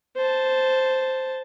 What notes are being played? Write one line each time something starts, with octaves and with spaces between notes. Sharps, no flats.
C5 A5